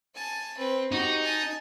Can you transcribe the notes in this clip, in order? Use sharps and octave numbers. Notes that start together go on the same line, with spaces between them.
G#5 A5
C4 B4
D#4 F#4 G4
G#5 A5